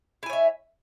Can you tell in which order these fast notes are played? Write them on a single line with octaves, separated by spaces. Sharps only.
E4 G#5 C#5 E5